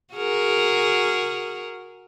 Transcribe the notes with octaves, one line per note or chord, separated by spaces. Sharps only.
F#4 G#4 A#4